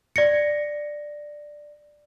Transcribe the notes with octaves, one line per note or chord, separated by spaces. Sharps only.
D5 A#6 C#7